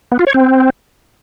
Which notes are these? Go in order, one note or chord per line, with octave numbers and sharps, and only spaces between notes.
B3
F4
C#5
C4